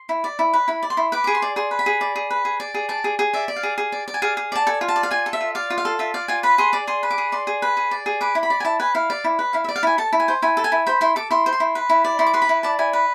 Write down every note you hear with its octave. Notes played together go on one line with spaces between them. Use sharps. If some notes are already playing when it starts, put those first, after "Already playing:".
Already playing: C6
E4
D5
E4
B4
E4 B5
D5
C6
E4
B4 D6
G#4 D6
C6
D5
G#4 C6
B4
B5
G#4
D5
G#4
B4
G#4
D5
G#4
D5 A5
G#4
G#4
D5 E5
D5
F5
G#4
G#4
D5
D5
G#5
G#4 F5
G#4
D5 A5
A4 G#5
F4
A5
D5
F5
F4 G#5
A4
E5
F4
D5 F5
F4
F5
A4
F4 E5
D5 F5
F4 G#5
B4 B5
G#4 C6
D5 D6
G#4 C6
B4
D6
G#4
D5 C6
G#4
B4
G#4
D5
G#4
B4 D6
E4
B5
D5
G#5
E4 A5
B4 G#5
E4 F5
D5
E4
B4
E4 F5
E5
D5
F5
E4 G#5
A4 A5
E4
G#5
C5
E4 G#5
A4
G#5
E4
C5 B5
E4 C6
A4 D6
E4 C6
C5
C6
E4
B4
E4
D5
E4 C6
D6
B4 C6
B5
E4
D5 A5
E4 G#5
B4